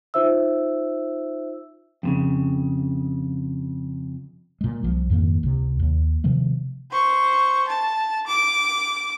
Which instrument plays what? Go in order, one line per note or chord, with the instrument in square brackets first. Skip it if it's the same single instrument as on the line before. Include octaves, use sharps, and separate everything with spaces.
[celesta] D#4 F4 C5 E5 E6
[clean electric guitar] F2 A#2 C#3
[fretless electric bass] A#2 G#3
C2 F3
F2 G#2 D#3 A#3
C#2 C3
D#2
C3 D#3 F3 A3
[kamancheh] C5 C#6
A5
D6